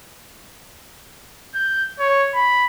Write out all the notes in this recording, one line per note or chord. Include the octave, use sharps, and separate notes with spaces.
G6
C#5
B5